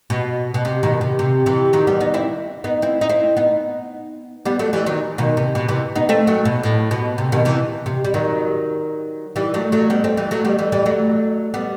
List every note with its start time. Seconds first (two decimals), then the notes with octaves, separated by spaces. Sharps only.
0.10 B2
0.54 B2
0.65 C3
0.83 B2 D#3
1.01 C3
1.19 C3
1.46 C3 E3
1.73 D#3 F#3
1.87 G3 B3
2.00 B3 D#4
2.14 C4 E4
2.64 B3 D#4
2.82 C4 E4
3.01 D#4
3.09 C4 E4
3.37 B3 D#4
4.45 G3 B3
4.59 F#3 A3
4.73 E3 G3
4.86 D#3 F#3
5.18 B2 D#3
5.37 C3
5.55 B2
5.69 C3 E3
5.95 B3 D#4
6.09 A3 C4
6.27 F#3 A3
6.45 B2
6.63 A2
6.91 B2
7.18 C3
7.32 B2 D#3
7.45 C3 E3
7.86 C3
8.05 G3
8.14 D#3 F#3
9.36 E3 G3
9.54 F#3 A3
9.72 F#3 A3
9.90 G3 B3
10.04 A3 C4
10.17 E3 G3
10.31 F#3 A3
10.45 G3 B3
10.59 E3 G3
10.72 E3 G3
10.86 F#3 A3
11.54 G3 B3